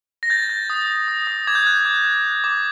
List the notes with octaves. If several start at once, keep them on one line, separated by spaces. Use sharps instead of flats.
A#6
G6 A6
G6
D#6
D#6
D#6
D#6
D6 G#6
G6
F#6 G#6
D6
F#6
F#6
D6